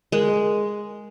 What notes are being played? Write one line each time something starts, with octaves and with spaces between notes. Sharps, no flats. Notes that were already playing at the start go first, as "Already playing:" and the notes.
G#3 A#4